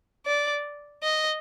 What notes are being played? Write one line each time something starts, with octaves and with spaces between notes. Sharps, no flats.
D5
D#5